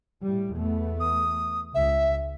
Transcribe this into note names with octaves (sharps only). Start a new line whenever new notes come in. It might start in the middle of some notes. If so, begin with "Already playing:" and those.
A2 G3
E2 A3 B3
D#6
C#2 E5